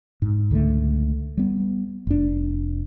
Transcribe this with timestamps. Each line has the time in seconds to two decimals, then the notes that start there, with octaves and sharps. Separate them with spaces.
0.22 G#2
0.51 C#2 D3 F#3 A3
1.37 G3 B3
2.07 F1 D4